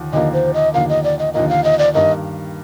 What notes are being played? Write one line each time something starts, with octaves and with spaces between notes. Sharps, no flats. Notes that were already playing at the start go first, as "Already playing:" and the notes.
Already playing: D#2 D3 F3
D#2 D3 F3 A#3 D#5
C5
D#5
D#2 D3 F3 A#3 F5
D#5
D5
D#5
D#2 D3 F3 A#3 D#5
F5
D#5
D5
G2 D#3 A#3 D#5